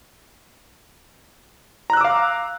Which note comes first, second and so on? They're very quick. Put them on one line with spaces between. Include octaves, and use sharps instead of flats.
A#5 F#6 E6 D6 F5